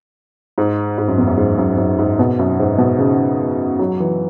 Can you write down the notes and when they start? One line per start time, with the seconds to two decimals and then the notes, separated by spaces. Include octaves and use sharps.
0.58 G#2
0.98 G#2
1.08 F#2
1.18 E2
1.27 F#2
1.37 G#2
1.58 F#2
1.78 F#2
1.99 G#2
2.19 B2
2.39 F#2
2.59 G#2
2.78 B2
2.99 C#3
3.79 F#3
4.00 E3